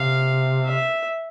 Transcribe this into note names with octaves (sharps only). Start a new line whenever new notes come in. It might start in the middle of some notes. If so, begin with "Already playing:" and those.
Already playing: C3 F5
E5